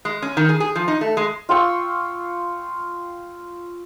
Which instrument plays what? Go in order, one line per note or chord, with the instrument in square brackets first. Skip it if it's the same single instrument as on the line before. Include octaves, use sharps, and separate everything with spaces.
[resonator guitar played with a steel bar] G#3
C#4
D#3
G#4
G#4
F3
D#4
A3
G#3
[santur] F4 G5 C#6 E6